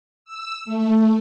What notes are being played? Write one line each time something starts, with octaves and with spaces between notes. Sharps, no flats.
E6
A3